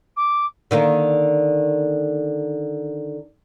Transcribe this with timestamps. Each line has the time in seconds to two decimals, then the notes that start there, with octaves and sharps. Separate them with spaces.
0.16 D6
0.71 D3 D#3 A#3